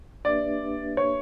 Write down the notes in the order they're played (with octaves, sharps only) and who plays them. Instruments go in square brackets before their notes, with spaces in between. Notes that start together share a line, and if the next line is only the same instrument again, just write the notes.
[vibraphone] A#3 D4 G4 B4 E5 [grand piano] D5
[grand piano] C#5